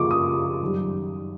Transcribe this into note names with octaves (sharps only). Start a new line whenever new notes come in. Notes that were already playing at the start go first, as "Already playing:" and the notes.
Already playing: C#3 F3 A#3 C#6 D6
D#6
F#2 D#3 G3